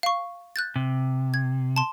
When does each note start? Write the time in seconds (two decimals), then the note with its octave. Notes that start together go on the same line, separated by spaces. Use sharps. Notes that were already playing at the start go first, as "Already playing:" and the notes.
0.03 F5 C#6
0.56 F#6 G6 A6
0.76 C3
1.34 G#6
1.76 A5 C6